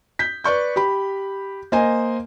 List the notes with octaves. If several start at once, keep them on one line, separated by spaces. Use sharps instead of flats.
G6 B6
B4 D5 C#6 G6
G4 B5
A#3 C5 D#5 G#5